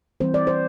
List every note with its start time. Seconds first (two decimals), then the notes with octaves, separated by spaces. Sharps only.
0.21 E3 G3 C4 C5
0.34 D5
0.47 C5